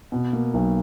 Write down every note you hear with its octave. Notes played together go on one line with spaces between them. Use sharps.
B2
A#3
B1